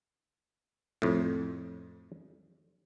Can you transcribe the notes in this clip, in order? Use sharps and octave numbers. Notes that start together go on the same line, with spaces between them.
F2 A2